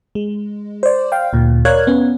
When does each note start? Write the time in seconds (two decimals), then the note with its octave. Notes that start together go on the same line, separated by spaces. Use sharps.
0.15 G#3
0.83 C5 D5
1.12 F5 G5
1.33 D2 A#2
1.65 A#4 C#5 D5 F5 F#6 G#6
1.87 B3 C#4